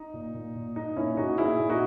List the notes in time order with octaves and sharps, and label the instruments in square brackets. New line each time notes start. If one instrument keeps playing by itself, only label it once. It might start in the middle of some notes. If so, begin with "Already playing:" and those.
Already playing: [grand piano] D#4
A#2
A#2
A#2
A#2 D#4
A#2 C#4 E4
A#2 D#4 F#4
A#2 E4 G#4
A#2
D#4 F#4